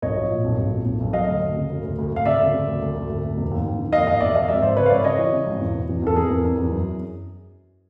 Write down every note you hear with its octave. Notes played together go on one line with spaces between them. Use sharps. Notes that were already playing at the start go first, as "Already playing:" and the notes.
B1 C#5 D#5
F3
A#2
B1
B1
A#2
B1
B1
F#3 D#5 F5
D2
D2
C#3
D2
D2
D2
D2 F5
C#3 D5 E5
D2
C#3
D2
D2
D2
D2
D2
E1
D#2
D#2
D#3
D#2 D#5 F5
D#2 D#5 F5
E1 D5 E5
E1 D#5 F5
G#1 D5 E5
G#1 C5 D5
C#3 B4 C#5
F5
G#1 D5 E5
C#3 C#5 D#5
E3
C#3
G#1
E2
B2
E2
E2 A4
E2 G#4 A#4
E2
E2
E2
F#2